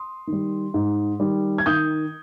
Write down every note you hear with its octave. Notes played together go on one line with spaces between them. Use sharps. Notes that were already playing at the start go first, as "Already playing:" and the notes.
Already playing: C6 D#6
D#3
G3
G#2
D#3 G3
G#6
D#3 D#6 G6